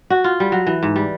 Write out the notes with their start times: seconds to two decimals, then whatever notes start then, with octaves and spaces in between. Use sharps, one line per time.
0.10 F#4
0.24 F4
0.40 G3
0.52 F#3
0.67 E3
0.83 G#2
0.96 G3